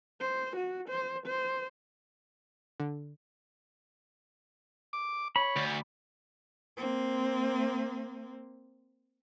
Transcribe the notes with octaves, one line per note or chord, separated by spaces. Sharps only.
C5
F#4
C5
C5
D3
D6
C#5 B5
D2
A#3 C4